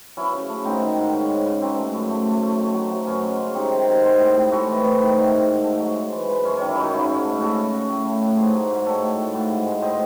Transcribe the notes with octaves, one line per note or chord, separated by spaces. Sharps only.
F#3 C#4 E4
C#3
A3
G#2 C4 D#4
D#3
G#2
C#3 C#4
C#3
C#3
F#3 C4
A3
F#2
A3
A3
A3
A3
F#3
F#3
F#2 C#4
G#3
C#3
C3 C4 D#4
D#3
C3
G#3 G#4 C5
A2
A2
A2 F#4 A4
E3
A2
D#3
G#2
G#2
G#2
A3
F#3
G#3
E3
G#3
F#2 C#4
D#3 C#4
C#4 E4
F#2 D#4 F#4 G#4
G#2 E4 G#4
G#2
A3
C#3 F#4 A4
C#3
C#3
A2
A3
A2
G#2 G#4 C5
F#3
G#2
A2 A4 C#5
A3
A2
G#2
G#2
G#3
A2 C5 D#5